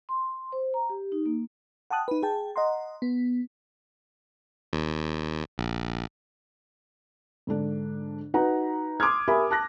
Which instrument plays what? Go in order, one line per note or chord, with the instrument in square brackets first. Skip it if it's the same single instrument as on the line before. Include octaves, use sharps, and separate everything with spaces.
[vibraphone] C6
C5
A#5
G4
D#4
A#3
[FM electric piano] F#5 G5 A5 D#6 F#6
D#4 B4
G#4 G5 A5
D#5 F#5 A#5 C6
B3
[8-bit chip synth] D#2
A#1
[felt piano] G#2 D3 D4
D#4 F#4 B4 F#5 A#5
C6 D6 D#6 F6 G#6
G4 A#4 E5 G#5 B5
A5 F#6 A#6